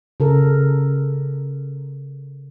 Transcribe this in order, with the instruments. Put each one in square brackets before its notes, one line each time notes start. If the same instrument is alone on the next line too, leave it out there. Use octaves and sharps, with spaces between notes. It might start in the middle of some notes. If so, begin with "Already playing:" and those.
[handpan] C#3 A4 A#4